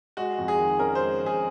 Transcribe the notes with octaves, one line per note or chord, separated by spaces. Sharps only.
G#3 F#4
F2
G#4
D#3
C#4 A#4
C5
G#3
F2 G#4